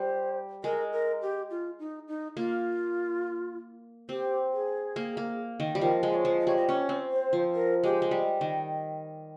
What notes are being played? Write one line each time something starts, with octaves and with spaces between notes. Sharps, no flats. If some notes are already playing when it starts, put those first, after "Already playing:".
Already playing: G3 C5
G#3 A#4
A#4
G4
F4
D#4
D#4
A#3 F4
C4 G4
G#4
A#3
A#3
D#3
G3
F3 A#4
G#3
D#5
C#5
F3
D#5
G3 C#5
D#5
C#4 C#5
C4
C5
F3
A#4
G#3 G4
G#3
G3
D#3